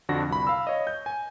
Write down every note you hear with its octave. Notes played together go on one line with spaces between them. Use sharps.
F2 D3 D4 F#4 A#6
C2 B5
F5 B5 E6
C#5 D#5
G6
G#5